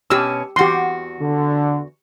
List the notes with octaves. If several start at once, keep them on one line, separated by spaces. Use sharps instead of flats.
B2 C#4 G4 E6
E2 F#4 G4 C6
D3